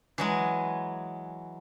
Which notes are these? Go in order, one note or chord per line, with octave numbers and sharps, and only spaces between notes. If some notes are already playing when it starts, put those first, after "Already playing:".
E3 F#3 G#3